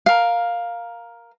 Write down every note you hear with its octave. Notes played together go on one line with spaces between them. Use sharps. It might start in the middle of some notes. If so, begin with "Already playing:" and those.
A#4 F5